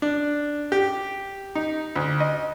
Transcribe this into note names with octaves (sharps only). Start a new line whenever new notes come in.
D4
G4
D#4
D2
D#5